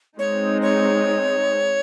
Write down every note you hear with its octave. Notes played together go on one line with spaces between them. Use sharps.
G#3 C4 D#4 C#5
C#5